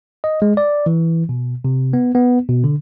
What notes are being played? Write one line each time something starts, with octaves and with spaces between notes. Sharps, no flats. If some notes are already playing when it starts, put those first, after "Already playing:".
D#5
G#3
D5
E3
B2
C3
B3
B3
B2
D3